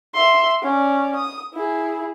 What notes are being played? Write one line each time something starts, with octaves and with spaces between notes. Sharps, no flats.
E5 C6
C#4 D5
D#6
E4 G#4